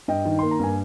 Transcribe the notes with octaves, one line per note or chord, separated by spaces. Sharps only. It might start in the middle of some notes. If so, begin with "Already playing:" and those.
G2 D#5 G5
D#3
A#3 C6
A#5
G2 G#5